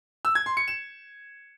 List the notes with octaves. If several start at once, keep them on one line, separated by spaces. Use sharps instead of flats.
E6
G#6
C6
C#7
E7